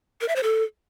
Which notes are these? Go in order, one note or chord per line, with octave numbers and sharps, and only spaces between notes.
A#4
E5
C5
A4